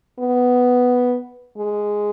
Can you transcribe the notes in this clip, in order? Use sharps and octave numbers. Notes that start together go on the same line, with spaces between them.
B3
G#3